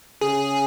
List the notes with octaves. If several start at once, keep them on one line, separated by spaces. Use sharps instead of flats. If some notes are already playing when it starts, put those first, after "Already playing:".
C#3 G#4